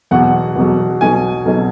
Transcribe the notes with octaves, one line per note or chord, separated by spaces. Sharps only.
E2 B2 F#3 F#5
E2 B2 F#3
B1 B2 F#3 G#5
B1 B2 F#3